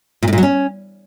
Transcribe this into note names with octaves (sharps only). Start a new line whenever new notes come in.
A#2
A2
A#2
F#3
C#4